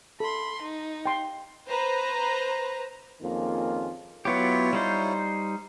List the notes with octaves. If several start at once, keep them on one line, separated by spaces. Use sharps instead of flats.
A4 B5 C6
D#4
G5 C6
B4 C5 A#5
F2 D#3 A#3 C#4 F4 G#4
F#3 B3 E4 F4 G4 C#5
G3 D#4 C5